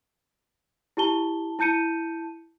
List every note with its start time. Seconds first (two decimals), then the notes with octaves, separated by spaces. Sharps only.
0.97 E4 G4 A5 G7
1.59 E4 A5 G6 C#7 D#7